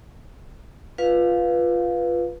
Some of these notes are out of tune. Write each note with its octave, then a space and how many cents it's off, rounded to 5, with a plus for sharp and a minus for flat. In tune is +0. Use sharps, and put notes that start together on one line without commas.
F4 +0 B4 -5 F5 +10